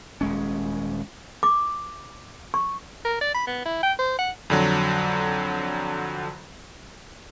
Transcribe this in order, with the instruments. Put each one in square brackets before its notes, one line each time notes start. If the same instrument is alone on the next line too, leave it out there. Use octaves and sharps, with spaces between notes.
[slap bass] D#1 G#3 C#4
[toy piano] D6
C#6
[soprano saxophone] A#4
D5
B5
B3
E4
G5
C5
F#5
[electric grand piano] F2 D3 F#3